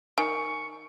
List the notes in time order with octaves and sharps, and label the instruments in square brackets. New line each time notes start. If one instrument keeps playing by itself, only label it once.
[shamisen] D#3 [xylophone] G#5 [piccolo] C#6